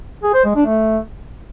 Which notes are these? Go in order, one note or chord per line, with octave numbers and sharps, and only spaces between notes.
G#4
C5
G#3
D4
A3